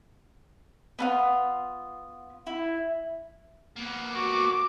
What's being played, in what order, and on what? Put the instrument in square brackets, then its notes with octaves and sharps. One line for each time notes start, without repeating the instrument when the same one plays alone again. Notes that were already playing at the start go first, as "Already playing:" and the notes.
[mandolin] B3 D4 F4
E4
[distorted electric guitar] A#3 B3
[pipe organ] F#4 [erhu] D6